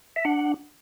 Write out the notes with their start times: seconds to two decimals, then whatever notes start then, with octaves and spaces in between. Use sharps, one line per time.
0.16 E5
0.25 D4 F#5